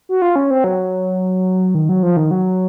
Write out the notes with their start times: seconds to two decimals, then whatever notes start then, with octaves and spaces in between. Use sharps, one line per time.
0.09 F#4
0.22 F4
0.36 C#4
0.51 C4
0.64 F#3
1.75 D#3
1.89 F#3
2.03 F3
2.17 D#3
2.31 F#3